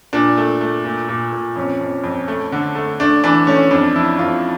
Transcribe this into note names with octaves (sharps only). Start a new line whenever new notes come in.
A#2 D4
A3
A3
A#2
A#2
A#2
F2 C#4
F2
F2
A3
D3
A3
A3 D4
E3 D4
A3 C#4
F2 D4
F3 E4
F2 F4